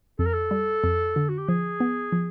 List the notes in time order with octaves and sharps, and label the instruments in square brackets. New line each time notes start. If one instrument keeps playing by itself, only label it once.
[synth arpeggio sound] F2 [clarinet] A4
[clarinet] A#4
A4
[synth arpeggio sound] G3
F2
D3
[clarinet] F#4
G4
[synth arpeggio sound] F3 [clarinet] G#4
[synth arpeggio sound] B3
F3